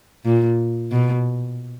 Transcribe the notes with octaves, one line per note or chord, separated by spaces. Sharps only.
A#2
B2